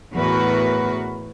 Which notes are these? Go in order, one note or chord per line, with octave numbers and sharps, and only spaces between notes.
E2 A2 F#4 A#4 B4